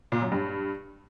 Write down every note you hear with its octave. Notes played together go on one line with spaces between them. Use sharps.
A#2
F#2
G2